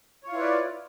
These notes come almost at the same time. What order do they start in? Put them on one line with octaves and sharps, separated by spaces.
C#5 F4 E4 B4 D5